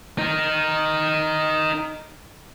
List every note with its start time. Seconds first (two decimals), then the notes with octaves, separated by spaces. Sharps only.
0.18 D#4 A#4